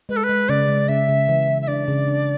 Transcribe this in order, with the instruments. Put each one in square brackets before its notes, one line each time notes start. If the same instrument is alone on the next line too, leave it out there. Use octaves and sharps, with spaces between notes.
[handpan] G#3 [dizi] B4
[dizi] A4
B4
[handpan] G#3
[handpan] C#3 [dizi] D5
[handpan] G#3
[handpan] C#3 [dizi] E5
[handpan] C#3
E3
E3
[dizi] E5
[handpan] D4 [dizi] D5
[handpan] C#3
D4